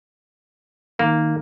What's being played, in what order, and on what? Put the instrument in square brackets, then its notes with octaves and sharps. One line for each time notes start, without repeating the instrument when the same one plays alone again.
[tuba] D#3 [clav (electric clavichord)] A#3